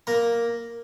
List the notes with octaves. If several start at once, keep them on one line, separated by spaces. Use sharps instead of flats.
A#3 A#5